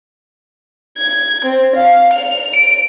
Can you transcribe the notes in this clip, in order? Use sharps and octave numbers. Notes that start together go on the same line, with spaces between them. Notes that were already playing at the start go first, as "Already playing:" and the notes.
G#6
C4
F5
F7
D7